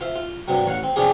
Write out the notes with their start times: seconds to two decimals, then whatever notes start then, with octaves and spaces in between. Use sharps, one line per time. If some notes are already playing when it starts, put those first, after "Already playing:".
0.01 F4 C5 E5
0.16 F4
0.48 G2 C3 F#3
0.66 A1 C#5 F5 F#5
0.84 C4
0.96 C3 F3 C#4 D4 G4 G#4